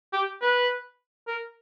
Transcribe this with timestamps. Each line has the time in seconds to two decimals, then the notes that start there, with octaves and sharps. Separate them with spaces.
0.13 G4
0.42 B4
1.27 A#4